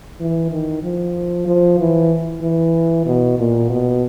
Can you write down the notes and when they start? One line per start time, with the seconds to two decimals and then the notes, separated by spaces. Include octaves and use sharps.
0.20 E3
0.51 D#3
0.83 F3
1.47 F3
1.79 E3
2.42 E3
3.06 B2
3.39 A#2
3.70 B2